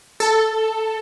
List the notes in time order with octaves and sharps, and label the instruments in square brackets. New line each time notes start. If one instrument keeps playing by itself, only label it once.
[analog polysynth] A4